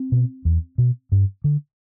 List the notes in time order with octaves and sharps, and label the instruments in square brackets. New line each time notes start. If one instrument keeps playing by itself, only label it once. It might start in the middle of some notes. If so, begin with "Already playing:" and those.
Already playing: [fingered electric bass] C4
B2
E2
B2
G2
D3